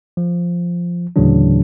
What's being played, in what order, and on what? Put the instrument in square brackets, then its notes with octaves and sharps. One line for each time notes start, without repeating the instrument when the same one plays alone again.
[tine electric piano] F3
D2 A2 C#3 E3 F#3 D4